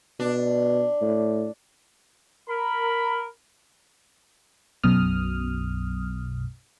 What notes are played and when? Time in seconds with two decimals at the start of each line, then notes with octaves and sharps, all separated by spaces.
0.20 B2 D4
1.01 A2
2.48 A#4 B5
4.84 B1 F#2 B2 D#6 F6